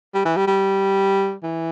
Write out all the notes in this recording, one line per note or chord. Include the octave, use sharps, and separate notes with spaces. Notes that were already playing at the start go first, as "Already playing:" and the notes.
G3
E3
G3
G3
E3